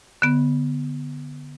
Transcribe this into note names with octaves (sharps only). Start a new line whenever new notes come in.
D3 B3